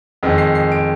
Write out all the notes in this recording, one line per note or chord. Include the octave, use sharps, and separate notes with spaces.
F2 D#3 G#3
C7
C7
D7